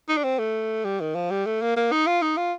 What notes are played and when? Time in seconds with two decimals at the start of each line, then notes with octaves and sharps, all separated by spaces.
0.09 D#4
0.17 D4
0.24 C4
0.39 A3
0.85 G3
1.00 D#3
1.15 F3
1.31 G3
1.46 A3
1.61 A#3
1.76 A#3
1.92 D#4
2.06 F4
2.22 D#4
2.37 F4